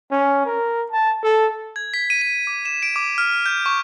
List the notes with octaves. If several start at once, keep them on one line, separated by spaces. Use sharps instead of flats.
C#4
A#4
A5
A4
G#6
B6
D#7
D#7
D6
E7
D7
D6
F6
G6
C#6